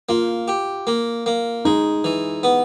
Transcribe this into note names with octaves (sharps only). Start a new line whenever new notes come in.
A#3 F4
G4
A#3
A#3
G#3 D#4
E3
B3